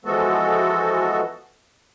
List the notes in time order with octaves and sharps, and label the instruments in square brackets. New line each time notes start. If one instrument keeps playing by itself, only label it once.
[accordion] E3 F3 G#3 B3 F#4 A4